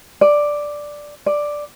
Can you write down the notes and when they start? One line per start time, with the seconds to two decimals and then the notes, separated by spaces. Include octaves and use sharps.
0.21 D5
1.26 D5